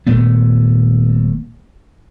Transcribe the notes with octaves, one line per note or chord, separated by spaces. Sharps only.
D#1 A#2 A3 B3